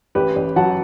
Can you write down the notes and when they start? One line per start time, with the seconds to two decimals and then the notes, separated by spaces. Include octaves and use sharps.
0.15 A1 G4 B4
0.36 A1
0.56 F#3 F#5 A5